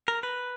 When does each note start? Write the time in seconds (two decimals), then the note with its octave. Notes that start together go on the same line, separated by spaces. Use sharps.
0.08 A#4
0.23 B4